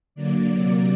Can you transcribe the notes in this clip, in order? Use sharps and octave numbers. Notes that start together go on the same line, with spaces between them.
D3 F#3 A#3 D5
C3 F#3 A#3